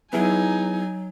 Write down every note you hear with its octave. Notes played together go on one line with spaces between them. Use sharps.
F#3 B3 D#4 E4 G#4 G#5